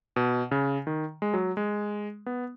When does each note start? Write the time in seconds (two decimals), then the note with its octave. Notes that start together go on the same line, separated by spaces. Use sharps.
0.16 B2
0.51 C#3
0.87 D#3
1.22 G#3
1.34 F#3
1.57 G#3
2.26 B3